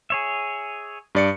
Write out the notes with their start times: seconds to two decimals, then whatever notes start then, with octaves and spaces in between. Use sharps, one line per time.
0.10 G#4 C#5 E5
1.15 G2 D5 C#7